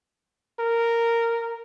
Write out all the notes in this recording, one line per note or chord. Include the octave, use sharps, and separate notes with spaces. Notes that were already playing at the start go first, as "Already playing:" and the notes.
A#4